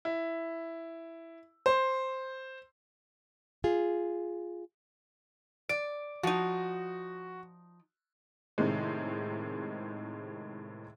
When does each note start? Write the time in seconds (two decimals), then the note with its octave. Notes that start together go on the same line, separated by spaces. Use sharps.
0.05 E4
1.66 C5
3.64 F4 G#4
5.69 D5 D7
6.23 F3 D#4 F#4
8.58 A2 C3 D#3 G#3